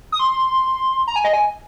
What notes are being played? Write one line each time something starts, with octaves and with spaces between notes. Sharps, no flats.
D#6
C6
A#5
G#5
D#5
G#5